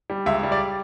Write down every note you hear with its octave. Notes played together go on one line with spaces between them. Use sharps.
G3
C#2 E5
G3
D5